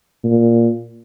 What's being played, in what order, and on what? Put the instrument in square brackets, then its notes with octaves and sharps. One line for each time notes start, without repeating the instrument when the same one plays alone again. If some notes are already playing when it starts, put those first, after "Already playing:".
[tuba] A#2